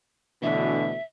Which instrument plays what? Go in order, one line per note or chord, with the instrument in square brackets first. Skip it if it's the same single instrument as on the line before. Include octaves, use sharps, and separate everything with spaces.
[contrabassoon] D2 [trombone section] B2 D3 E3 [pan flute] E5